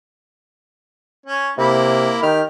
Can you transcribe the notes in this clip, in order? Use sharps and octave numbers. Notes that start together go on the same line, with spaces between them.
C#4
C3 A#3 E4
D#3 G4 F6